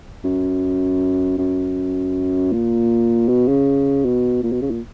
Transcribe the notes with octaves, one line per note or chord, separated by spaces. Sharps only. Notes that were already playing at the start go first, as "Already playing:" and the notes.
F#2
F#2
A#2
B2
C#3
B2
A#2
B2
C#3
A#2